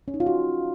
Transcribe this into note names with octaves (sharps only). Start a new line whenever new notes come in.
C#4
D#4
F4
F#4